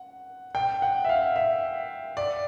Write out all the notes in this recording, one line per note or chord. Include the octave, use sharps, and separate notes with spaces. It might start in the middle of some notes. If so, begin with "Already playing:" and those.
Already playing: F#5
G5
F#5
E5
F5
E5
D5